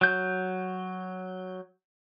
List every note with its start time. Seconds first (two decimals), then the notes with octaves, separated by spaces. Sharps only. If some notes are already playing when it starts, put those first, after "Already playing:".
0.01 F#3 G6